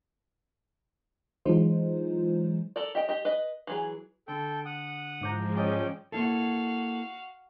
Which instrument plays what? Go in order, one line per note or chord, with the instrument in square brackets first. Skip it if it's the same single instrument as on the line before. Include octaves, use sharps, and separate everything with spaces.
[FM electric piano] E3 F#3 G#3 D#4 F4 C5
[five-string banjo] A4 A#4 D5
G4 D#5 G5
G4 D#5
B4 D#5
E3 F#3 G#4
[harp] D3 [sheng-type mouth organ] A4 G5
[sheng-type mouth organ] F#5 D#6
[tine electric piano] G#2 D6 G6 [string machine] F3 G#3 [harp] E4 C5 A#5
[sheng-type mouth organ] C#4 G5 [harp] G#4 D5 D#5
[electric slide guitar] A#3 E4 A4 [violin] F#4 F5